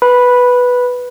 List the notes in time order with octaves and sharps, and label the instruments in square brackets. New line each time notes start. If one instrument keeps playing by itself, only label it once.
[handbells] B4 B5